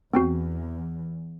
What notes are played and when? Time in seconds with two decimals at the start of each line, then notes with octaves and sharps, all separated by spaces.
0.13 E2 B3 C4 F#4